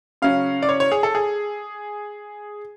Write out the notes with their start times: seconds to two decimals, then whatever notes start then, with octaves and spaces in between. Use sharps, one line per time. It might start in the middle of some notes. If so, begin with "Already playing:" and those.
0.22 C#3 F#3 C#4 F5
0.63 D5
0.69 C#5
0.80 C#5
0.92 G#4
1.03 A4
1.15 G#4